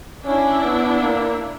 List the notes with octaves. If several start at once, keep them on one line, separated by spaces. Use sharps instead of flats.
C#4 D4 E4
B3
A#3